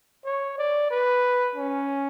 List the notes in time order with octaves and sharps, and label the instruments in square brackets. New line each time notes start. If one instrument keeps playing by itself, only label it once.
[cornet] C#5
D5
B4
C#4